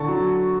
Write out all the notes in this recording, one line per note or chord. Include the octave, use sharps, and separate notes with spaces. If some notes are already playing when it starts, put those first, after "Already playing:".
Already playing: D3 A5 C#6
F#3